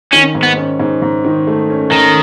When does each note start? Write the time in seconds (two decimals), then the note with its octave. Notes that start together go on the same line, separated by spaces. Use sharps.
0.13 D#3 C#4
0.35 G#2
0.43 B3
0.58 C#4
0.80 G#2
1.02 G#2
1.25 D#3
1.47 A3
1.70 C#4
1.91 D#3 C#4